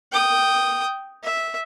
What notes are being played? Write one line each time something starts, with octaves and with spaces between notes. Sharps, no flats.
G5 D#6
E5